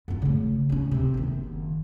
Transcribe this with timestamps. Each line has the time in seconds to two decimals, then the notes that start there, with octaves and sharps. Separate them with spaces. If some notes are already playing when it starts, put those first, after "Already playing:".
0.08 F#2 F4
0.22 C#3 A3
0.69 A1 C#4
0.91 E2 C3
1.14 F#1 D#3